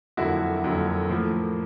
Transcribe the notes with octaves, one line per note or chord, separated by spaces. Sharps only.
F2 D3 F#3 A#3 E4 F#4
F2 D3 F#3 A#3
A2 F3 A#3